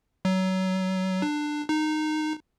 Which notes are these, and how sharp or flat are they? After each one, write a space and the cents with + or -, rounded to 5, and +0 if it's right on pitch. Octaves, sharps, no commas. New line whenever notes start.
F#3 +25
D4 +20
D#4 -15